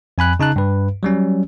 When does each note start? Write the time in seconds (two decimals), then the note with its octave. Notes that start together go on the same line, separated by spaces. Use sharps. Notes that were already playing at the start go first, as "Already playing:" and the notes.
0.18 F2 G#5 B5 F#6
0.40 C#3 D#4 A5 F#6
0.56 G2 B4
1.03 F#3 G3 C#4